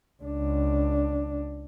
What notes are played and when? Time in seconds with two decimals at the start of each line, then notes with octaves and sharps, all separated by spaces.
0.23 C#2 D4